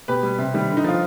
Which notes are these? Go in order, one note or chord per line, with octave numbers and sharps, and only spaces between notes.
B2 G4 B4
G3
C3
D#3 G3
D3
D#4
F3 F4